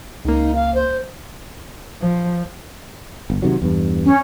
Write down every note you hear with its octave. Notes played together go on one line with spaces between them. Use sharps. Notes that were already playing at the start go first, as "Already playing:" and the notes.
C#2 A#3 D#4
F5
C5
F3
G1
C3 D#3 F#3
E2 G2
C#4